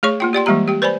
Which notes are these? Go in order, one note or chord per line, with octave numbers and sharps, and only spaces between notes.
A3 G#4 C#5 C#6
A#3 F4 G5
G4 D5 G5 C6
E3 G3 G#3 A#3 G4 A#5
G4 G5
B4 C5 D5 G#5 B5